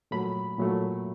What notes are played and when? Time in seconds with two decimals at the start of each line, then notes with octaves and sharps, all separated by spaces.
0.11 A#2 F#3 A3 B5
0.58 A#2 F#3 A3